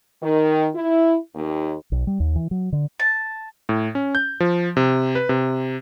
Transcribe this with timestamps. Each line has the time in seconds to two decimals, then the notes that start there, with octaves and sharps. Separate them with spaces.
0.22 D#3
0.75 E4
1.35 D#2
1.92 B1
2.07 G3
2.20 D#2
2.36 E3
2.51 F#3
2.72 D3
3.00 A5
3.69 A2
3.95 C#4
4.15 G6
4.40 F3
4.77 C3
5.15 B4
5.29 C3